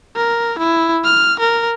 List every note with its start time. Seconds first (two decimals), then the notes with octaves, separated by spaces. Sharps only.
0.16 A#4
0.58 E4
1.05 F6
1.39 A#4